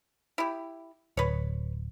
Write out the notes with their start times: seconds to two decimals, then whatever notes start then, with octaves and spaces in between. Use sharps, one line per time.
0.38 E4 G4
1.17 D1 B4 C#5